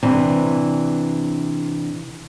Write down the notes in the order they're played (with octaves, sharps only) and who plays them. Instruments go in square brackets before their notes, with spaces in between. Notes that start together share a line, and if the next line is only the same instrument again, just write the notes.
[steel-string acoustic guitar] C3 E3 D4